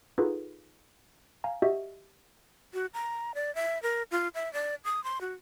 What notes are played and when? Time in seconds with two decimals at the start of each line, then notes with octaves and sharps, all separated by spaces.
0.18 D#4 F4 F#4 G#4 A4 B4
1.44 F5 G#5 A#5
1.62 F#4 G4 D#5 E5
2.74 F#4
2.94 A#5
3.35 D5
3.55 E5
3.83 A#4
4.11 F4
4.35 E5
4.53 D5
4.85 D#6
5.04 C6
5.21 F#4